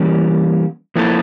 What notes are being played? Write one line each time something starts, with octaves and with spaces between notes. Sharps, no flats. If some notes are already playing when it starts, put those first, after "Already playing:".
Already playing: E3 G3 A#3 C#4
F3 A#3 E4 A4